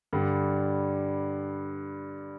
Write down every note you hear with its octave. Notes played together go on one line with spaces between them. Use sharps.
G2 D3 G3